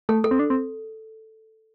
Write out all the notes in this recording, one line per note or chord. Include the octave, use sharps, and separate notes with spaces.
A3 A4
A4
C4
D4
C4